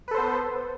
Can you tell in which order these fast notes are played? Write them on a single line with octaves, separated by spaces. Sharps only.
B4 A4 C5 B3